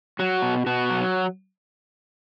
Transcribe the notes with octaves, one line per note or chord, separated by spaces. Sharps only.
F#3 F#4
B2
B2 F#4
F#3